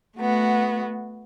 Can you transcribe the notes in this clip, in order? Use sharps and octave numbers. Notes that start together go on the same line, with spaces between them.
A3 B3 F#4